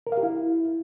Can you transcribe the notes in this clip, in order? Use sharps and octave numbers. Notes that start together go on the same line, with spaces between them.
A#4
F5
G4
E4